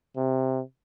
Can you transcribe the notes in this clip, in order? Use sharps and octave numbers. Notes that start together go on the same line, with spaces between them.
C3